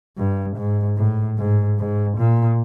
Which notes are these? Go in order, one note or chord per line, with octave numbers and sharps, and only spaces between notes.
G2
G#2
A2
G#2
G#2
A#2